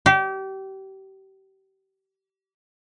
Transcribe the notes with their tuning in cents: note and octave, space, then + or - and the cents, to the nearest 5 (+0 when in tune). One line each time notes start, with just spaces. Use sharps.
G4 -30